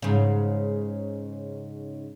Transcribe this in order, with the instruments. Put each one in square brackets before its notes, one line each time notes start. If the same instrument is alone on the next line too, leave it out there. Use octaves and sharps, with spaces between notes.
[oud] G#2 C#3